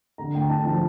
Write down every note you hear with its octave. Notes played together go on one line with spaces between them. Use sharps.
D3 A#5
D2 G5
D3 A5
F3 A5